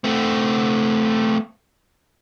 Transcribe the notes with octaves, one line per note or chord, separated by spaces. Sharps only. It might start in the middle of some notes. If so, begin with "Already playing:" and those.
A3 C4